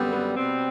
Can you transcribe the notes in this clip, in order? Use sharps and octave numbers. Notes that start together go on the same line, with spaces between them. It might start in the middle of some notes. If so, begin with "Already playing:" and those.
Already playing: F#2 D3 G3 B3 C4
B3
B2 G3 C4